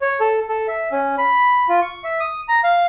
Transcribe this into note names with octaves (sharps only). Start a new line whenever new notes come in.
C#5
A4
A4
E5
C#4
B5
F4
C#6
E5
D#6
A#5
F5